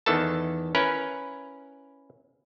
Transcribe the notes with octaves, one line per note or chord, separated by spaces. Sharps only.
E2 D#3 E3 A4 A5
C#4 E4 A#4 B4